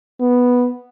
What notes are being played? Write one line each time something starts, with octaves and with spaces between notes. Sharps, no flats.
B3